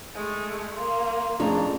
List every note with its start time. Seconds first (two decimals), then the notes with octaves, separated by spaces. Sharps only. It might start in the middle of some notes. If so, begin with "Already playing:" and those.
0.15 G#3 A3
0.76 A#3 C6
1.40 F2 A2 C#4 D4 G#4 A#5